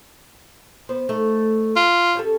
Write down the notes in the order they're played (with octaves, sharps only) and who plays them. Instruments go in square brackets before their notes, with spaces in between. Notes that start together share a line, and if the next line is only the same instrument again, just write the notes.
[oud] B3 C5
A3 D#4
[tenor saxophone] F4
[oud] C#4 G4 A4